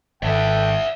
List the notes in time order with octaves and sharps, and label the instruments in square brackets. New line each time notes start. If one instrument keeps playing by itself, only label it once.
[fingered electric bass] G#1 [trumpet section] A4 B4 G5 [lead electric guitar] D5 E5